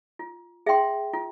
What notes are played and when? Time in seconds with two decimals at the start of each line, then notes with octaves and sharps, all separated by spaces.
0.19 F4
0.66 G#4 E5 G5 C6
1.13 F4